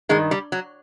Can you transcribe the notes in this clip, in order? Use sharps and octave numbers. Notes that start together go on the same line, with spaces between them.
G2 D#3 G#3
G3
F#3